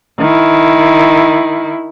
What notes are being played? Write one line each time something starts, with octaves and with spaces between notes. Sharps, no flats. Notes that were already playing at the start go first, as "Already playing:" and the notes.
D#3 E4